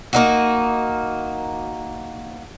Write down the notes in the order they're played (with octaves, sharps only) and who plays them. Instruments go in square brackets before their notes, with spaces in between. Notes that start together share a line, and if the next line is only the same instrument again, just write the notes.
[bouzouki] A#3 D#4 F#4